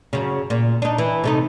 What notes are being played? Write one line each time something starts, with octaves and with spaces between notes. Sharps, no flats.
F#2 C#3
A#2
D4 D#4
E3
C3 A3 D#4